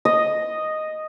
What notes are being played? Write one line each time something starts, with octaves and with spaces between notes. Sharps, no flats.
D#5